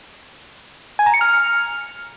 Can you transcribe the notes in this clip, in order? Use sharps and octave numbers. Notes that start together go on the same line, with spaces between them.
G#5
A#5
C#7
F6